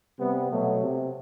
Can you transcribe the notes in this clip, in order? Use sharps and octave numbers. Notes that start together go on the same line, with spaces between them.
C3 G3 B3
B2 F#3 A3
C3